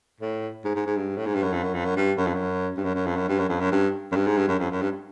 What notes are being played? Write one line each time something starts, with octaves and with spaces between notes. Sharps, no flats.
A2
G#2
G#2
G#2
G2
A2
G#2
G2
F#2
F2
F#2
F2
F#2
G2
F#2
F2
F#2
G2
F#2
F#2
F2
F#2
G2
F#2
F2
F#2
G2
F#2
G2
G#2
G2
F#2
F2
F#2
G2